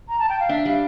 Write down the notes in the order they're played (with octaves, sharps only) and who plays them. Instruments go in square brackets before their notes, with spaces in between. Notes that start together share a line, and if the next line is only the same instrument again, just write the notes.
[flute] A#5
A5
G5
F5
[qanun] D4 [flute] E5
[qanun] G3 [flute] F5